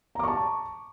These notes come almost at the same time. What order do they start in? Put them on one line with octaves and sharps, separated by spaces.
A#5 D6 C#6 A5